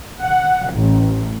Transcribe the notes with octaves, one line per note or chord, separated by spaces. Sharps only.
F#5
A1